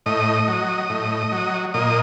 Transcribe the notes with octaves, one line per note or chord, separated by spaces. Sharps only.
A2 D#5
F#3
A2
F#3
A#2 D#5